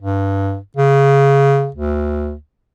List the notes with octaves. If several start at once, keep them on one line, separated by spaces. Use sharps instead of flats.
G2
C#3
D2